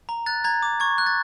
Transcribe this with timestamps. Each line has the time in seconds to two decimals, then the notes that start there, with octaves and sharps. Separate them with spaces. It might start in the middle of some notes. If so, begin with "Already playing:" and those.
0.09 A#5
0.26 F#6 A6
0.44 A#5 G#6
0.63 D6
0.80 C#6 G#6
0.98 F#6
1.06 A6